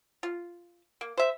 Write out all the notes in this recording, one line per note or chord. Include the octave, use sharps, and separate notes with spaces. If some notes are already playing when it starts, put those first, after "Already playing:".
F4
A#3
C5 E5